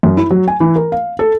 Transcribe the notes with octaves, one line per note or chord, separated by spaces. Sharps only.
F#2
E4
F#3
G#5
E3
A#4
F5
A4